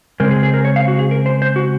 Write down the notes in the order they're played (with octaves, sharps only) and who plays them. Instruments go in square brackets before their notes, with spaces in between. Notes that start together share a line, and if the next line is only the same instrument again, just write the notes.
[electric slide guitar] C#3 G#3 C4 A#4
G#4
G#4
A#4
C#5
F5
F#4
G#4
A#4
C5
C5
F#4